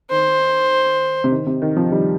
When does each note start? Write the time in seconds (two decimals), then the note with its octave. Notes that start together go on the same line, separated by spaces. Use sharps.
0.11 D#3 C5
1.24 C3
1.31 D#3
1.47 C3
1.62 D#3
1.77 C3 F3
1.92 D#3 G3